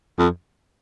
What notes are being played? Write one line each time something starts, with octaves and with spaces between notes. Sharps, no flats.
F2